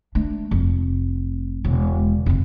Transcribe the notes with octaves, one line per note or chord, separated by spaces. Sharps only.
A3 D4
F1
E1 C#3
F1 C#3